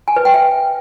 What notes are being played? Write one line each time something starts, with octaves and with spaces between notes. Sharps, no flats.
G#5
B4
G5
E5